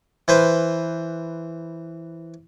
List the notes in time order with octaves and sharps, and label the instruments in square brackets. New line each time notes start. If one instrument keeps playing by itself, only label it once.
[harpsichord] E3 B4 C5